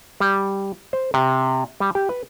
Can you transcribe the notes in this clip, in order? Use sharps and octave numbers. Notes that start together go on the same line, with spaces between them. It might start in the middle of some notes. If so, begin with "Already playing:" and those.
G3
C5
C3
G3
G4
B4